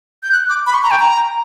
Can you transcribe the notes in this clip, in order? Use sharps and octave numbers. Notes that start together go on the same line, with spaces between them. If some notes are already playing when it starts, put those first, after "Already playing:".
G6
F#6
D6
B5
C#6
A#5
G5
A#5